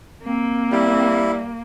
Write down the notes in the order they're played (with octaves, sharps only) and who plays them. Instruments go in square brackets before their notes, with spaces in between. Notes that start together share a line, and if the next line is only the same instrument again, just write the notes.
[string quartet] A#3 [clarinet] C4
[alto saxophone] G3 [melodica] E4